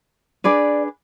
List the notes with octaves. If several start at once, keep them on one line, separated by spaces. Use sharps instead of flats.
D4 G#4 B4 D5